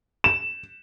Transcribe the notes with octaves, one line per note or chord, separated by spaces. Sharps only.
E7